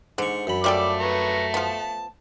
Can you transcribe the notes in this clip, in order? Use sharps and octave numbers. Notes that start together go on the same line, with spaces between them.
G#2 D3 C#6
F#2 B5
F3 G3 A3 A4 D5 D6
B4 A#5 C#6
F3 B3 A5